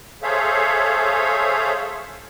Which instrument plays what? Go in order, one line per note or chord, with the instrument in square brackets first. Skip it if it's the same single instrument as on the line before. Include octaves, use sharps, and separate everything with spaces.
[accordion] G#4 A4 C5 C#5 E5 F5